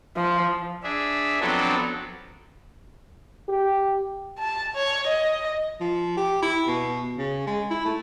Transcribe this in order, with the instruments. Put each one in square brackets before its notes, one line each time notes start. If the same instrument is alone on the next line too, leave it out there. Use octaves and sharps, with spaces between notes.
[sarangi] F3
[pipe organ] D4 G#4 E5
F3 F#3 B3 C4 D4 A4
[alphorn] G4
[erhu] A5
C#5
D#5
[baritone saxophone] F3
G4
E4
B2
C#3
G#3
E4
A3